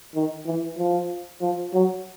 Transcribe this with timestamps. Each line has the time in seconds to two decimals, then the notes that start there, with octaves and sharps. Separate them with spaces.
0.15 D#3
0.46 E3
0.78 F3
1.41 F3
1.73 F#3